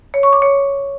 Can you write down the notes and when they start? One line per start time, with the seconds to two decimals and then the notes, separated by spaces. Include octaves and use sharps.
0.14 C#5
0.23 C#6
0.33 D6
0.42 C#5